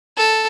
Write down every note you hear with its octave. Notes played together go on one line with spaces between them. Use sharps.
A4